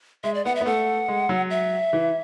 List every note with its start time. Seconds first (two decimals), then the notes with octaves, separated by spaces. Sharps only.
0.24 G#3 E5
0.34 D5
0.45 B3 F#5
0.55 E5
0.61 B3
0.66 A3 F#5
1.08 G#3
1.29 F#3
1.50 E5
1.93 E3